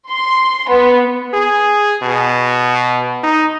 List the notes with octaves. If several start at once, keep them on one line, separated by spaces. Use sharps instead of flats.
C6
B3
G#4
B2
D#4